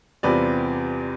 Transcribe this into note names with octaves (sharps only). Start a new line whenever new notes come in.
E2 C3 G3 C4 F4 B4 D5